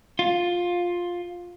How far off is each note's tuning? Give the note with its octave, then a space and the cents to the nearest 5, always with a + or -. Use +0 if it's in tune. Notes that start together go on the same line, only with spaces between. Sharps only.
F4 +10